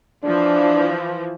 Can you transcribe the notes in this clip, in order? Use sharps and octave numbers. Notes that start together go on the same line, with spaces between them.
E3 F3 D4